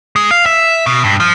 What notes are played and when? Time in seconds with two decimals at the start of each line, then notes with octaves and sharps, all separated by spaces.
0.16 G#3
0.31 F5
0.46 E5
0.86 B2
1.04 G2
1.20 F3